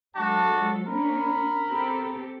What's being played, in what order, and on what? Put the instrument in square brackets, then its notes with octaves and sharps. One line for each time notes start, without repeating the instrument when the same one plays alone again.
[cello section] F#3 G#3 A4 [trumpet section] D4 F#4 A5
[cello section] A#3 C#4 D4 [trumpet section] A#4 B5
[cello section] C4 G4 A4